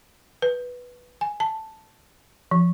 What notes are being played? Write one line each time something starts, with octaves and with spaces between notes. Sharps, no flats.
B4
G#5
A5
F3